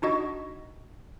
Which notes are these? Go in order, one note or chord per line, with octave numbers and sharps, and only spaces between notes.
D4 D#4 F#4 D#5